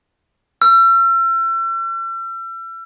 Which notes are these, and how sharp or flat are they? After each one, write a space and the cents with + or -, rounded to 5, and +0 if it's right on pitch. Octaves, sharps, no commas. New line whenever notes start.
E6 +40